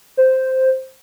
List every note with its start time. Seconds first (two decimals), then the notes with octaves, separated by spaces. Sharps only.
0.17 C5